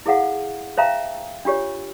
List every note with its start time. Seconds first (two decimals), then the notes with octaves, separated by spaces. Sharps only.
0.06 E4 G#4 A4 F5 F#5
0.78 C5 E5 F5 G5 A5 A#5
1.45 D4 F4 G4 C#5